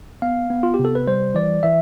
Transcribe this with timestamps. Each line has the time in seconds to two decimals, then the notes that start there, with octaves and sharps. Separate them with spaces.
0.22 B3 F5
0.50 B3
0.63 F4
0.74 G4
0.79 C3
0.85 A4
0.95 B4
1.07 G3 C5
1.35 E3 D5
1.63 E3 E5